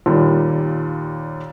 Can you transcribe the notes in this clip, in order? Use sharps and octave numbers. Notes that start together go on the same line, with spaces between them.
D#2 A#2 G3